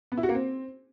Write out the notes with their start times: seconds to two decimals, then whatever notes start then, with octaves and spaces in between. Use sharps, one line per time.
0.12 B3
0.17 E4
0.23 F#4
0.29 A#3
0.35 C4